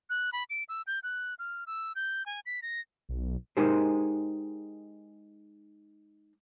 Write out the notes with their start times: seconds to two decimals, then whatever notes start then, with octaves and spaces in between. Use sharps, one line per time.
0.10 F#6
0.33 B5
0.50 D7
0.69 E6
0.87 G6
1.03 F#6
1.39 F6
1.67 E6
1.96 G6
2.26 G#5
2.46 B6
2.62 A#6
3.09 B1
3.57 G#3 D#4 G4 G#4 A#4 C5